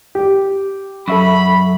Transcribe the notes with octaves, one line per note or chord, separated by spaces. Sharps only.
G4
F#2 A4 E5 B5 C#6